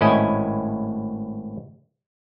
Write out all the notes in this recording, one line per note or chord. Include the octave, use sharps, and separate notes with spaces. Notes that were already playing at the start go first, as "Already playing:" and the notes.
G#1 A2 C#4 E4 D#5 G#5